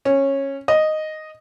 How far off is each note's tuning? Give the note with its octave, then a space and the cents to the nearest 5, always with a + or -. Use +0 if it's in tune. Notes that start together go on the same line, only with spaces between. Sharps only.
C#4 -15
D#5 -5